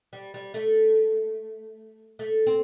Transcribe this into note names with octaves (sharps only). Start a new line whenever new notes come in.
G3
G3
A3
A3
C4